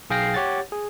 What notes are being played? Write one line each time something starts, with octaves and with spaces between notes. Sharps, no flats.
B1 G#4 F5 G5 A#6 C7
G4 C#5 F#5 A6
G#4